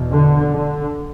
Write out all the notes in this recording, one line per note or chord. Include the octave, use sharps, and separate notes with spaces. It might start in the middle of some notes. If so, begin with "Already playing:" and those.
Already playing: E2 B2
D3
D3